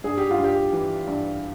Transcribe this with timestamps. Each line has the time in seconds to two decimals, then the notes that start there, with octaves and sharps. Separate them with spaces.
0.04 G2 G#4
0.18 G4
0.31 F4
0.38 G2
0.44 G4
0.73 E3
1.07 G2